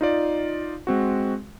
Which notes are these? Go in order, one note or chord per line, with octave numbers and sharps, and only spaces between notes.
D#4 F4 D5
G#3 C4 F#4